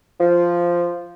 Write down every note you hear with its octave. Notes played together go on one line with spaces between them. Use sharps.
F3